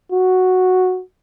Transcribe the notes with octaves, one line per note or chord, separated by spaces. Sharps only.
F#4